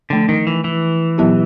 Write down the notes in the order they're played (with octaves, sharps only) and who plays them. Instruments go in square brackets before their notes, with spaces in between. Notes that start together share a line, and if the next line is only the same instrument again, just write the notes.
[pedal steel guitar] D3 [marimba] F3 A3 D4
[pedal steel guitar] D#3
E3
E3
[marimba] A#2 F#3 B3 E4 G4